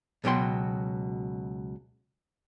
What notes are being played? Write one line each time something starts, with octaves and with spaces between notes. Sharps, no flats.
C#2 B2 F#3 G5 C6